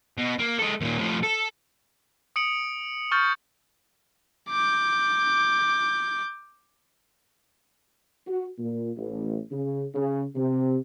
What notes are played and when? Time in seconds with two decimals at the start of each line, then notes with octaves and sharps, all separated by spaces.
0.18 B2
0.39 A#3
0.59 G#3 A4
0.81 D#2 A#2
0.98 A2 F3
1.23 A4
2.36 D#6 C#7 D7 F#7
3.11 C#6 F6 G6 A6
4.51 D6 G6
8.26 F#4
8.58 A#2
8.97 A1
9.51 C#3
9.94 C#3
10.35 C3